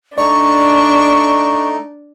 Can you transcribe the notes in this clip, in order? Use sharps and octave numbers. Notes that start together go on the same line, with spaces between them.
A3 D4 D#4 D5 C#6